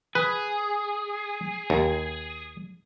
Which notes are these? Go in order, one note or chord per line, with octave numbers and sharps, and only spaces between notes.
G#4 B4
D#2